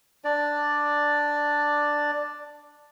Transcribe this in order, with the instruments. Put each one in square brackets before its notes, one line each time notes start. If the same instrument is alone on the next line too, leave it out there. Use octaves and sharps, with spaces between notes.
[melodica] D4 D5